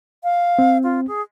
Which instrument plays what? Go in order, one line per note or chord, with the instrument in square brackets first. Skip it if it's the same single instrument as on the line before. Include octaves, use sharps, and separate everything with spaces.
[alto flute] F5
[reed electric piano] C4
[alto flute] F4
G#4